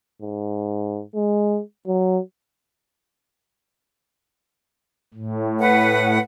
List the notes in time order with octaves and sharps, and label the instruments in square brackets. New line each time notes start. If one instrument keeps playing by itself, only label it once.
[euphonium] G#2
G#3
F#3
[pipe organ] A2
[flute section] B4 F#5